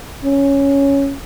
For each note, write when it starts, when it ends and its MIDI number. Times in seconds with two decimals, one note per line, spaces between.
0.25 1.15 61